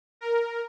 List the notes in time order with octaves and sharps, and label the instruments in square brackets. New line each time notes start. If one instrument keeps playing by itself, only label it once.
[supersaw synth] A#4